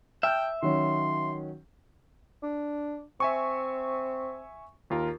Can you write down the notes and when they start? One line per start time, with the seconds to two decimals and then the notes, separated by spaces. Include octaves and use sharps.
0.23 E5 G5 A5 F6 G6
0.62 D#3 F#3 C#4 C6
2.43 D4
3.20 C4 E5 G#5 C#6
4.90 D#2 F4 A#4